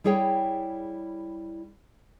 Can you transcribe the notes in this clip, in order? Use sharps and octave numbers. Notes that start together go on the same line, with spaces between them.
G3 E4 G#4 C#5 G5